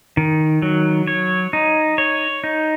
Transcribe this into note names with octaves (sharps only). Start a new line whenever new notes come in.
D#3
F#3
C#5
D#4
C#5
D#4